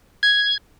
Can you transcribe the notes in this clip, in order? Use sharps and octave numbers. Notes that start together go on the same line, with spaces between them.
G#6